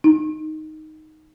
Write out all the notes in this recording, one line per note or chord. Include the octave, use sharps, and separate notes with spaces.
D#4